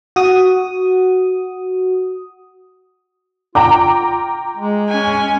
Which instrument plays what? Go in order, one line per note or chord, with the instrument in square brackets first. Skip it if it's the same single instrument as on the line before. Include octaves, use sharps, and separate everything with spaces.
[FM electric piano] F#4 D#6
[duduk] F4 [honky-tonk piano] G5 A#5 D6
[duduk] G#3
[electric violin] C#4 G#5